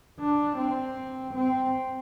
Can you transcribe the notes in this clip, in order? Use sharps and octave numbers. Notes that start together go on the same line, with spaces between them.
D4
C4
C4